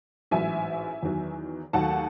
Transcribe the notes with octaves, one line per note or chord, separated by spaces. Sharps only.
A1 G#2 F#3 E5 G#5
E2 D#3 F#3
D#2 D#3 F#3 A3 F#5 A5